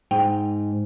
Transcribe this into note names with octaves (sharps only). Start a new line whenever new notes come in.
G#2 G5